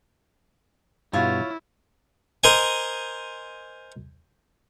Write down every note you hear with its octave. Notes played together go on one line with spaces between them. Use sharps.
G2 B2 E4 F4 C#5 F#5
A#4 C5 D#5 G#5